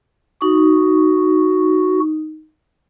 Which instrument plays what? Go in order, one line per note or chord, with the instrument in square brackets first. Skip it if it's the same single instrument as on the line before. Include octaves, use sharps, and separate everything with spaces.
[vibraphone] D#4 [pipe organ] F#4